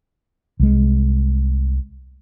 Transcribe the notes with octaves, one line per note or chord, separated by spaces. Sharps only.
C2 G#3